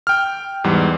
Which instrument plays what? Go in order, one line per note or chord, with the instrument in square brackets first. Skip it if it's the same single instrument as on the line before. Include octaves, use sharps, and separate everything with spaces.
[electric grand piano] G5 F6
E2 G#2 G3